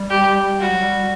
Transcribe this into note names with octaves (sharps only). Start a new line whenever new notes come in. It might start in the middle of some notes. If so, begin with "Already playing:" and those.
Already playing: G3
G4
G3 F#4
F#3
G3